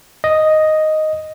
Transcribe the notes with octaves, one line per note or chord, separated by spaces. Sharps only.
D#5